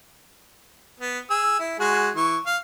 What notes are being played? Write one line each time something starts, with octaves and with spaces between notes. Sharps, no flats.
B3
G#4 E6
E4
G#3 F#4 G#4
E3 C#6
F5